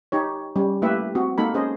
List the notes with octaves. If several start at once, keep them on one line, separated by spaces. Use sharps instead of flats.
D#4 G4 C#5
G3 C#4
A3 A#3 E4 G4 B4 E5
C4 F#4
G#3 A#3 D#4 A4 B5
C#4 G#4 C5 D#5